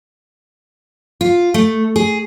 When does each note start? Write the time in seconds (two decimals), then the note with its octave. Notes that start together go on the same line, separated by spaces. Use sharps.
1.21 F4
1.54 A3
1.96 G#4